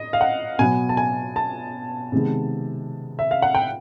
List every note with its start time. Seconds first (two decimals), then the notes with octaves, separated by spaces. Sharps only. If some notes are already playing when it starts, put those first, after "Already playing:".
Already playing: D#5
0.13 F5
0.21 F#5
0.59 B2 F#3 B3 G#5
0.89 A5
0.97 G#5
1.36 A5
2.12 C3 D#3 G#3 B3
3.19 E5
3.31 F5
3.42 F#5
3.55 G5